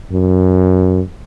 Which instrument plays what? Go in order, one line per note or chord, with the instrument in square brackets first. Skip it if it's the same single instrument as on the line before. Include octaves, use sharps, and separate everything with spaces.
[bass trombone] F#2